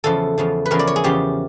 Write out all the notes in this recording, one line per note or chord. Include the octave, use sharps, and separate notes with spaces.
E2 C#3 F3 A4
E2 C#3 F3
B4
E2 C#3 F3 A#4
D5
C#5
G#4
E2 C#3 F3 G4